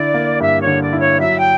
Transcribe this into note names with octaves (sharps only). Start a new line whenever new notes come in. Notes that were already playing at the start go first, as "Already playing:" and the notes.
Already playing: D3 E4 D5
A#3
G2 E5
C#5
D3
D5
E4
C#5
F#3 E5
G5